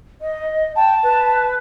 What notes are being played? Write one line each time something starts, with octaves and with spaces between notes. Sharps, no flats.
D#5
G5 A5
B4